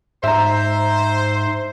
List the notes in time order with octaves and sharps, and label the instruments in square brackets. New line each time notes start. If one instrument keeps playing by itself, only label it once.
[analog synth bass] G#2 [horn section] C5 [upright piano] E5 A#5